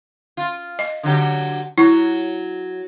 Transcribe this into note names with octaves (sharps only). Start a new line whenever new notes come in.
F4
D#5
D3 F#3 G4
F#3 E4